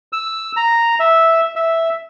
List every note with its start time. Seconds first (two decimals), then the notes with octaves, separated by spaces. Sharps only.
0.13 E6
0.57 A#5
1.00 E5
1.56 E5